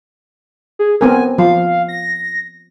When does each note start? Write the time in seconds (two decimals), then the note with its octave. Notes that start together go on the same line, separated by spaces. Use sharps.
0.79 G#4
1.01 B3 C4 A#4 G#5
1.38 F3 F5
1.88 A#6